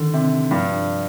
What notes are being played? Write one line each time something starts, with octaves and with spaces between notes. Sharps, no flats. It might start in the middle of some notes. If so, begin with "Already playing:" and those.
Already playing: D3 D#3
C3
G2 F3